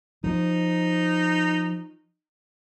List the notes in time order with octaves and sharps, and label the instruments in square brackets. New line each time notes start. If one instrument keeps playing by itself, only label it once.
[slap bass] F3 [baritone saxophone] D#4